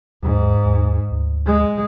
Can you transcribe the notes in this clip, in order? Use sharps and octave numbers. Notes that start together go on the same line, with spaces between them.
D#2 G#2
D#2
D2
G#3